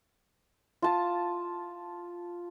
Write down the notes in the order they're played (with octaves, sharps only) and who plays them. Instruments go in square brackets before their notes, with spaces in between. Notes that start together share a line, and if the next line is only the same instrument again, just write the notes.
[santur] F4 A5 D#6